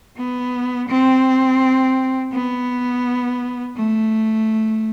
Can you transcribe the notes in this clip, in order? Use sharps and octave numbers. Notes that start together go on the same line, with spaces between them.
B3
C4
B3
A3